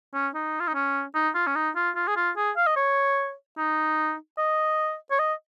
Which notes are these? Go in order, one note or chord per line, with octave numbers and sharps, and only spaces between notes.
C#4
D#4
F4
D#4
C#4
D#4
F4
C#4
D#4
F4
F4
G#4
F4
G#4
F5
D#5
C#5
D#4
D#5
C#5
D#5